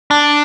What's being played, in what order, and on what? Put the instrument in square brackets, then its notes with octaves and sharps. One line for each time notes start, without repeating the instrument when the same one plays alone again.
[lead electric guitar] D4